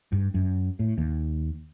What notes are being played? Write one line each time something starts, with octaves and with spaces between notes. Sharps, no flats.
G2
F#2
A2
D#2